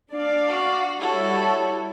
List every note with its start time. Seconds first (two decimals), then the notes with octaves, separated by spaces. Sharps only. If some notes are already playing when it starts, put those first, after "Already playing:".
0.12 D4 D5 F5
0.48 F#4
1.00 G3 E4 F#4 A4 C#5